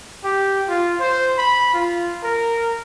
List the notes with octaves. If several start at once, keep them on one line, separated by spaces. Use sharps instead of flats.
G4
F4
C5
B5
F4
A#4